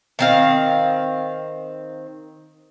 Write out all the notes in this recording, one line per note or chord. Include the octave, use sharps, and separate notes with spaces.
D#3 C4 F5